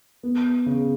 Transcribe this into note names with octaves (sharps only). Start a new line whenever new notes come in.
B3
C#3